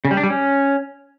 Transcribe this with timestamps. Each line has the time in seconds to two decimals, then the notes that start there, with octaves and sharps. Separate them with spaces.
0.05 C#3
0.11 G3
0.17 D4
0.23 G3
0.30 C#4